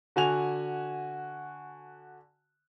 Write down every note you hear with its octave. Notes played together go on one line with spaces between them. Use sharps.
D3 F#4 G#5 F7